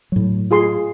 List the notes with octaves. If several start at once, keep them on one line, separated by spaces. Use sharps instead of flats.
A2 F#3
F4 G#4 C6